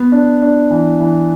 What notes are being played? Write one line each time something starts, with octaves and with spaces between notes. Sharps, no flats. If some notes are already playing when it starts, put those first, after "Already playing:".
Already playing: B3
D4
D4
E3
E3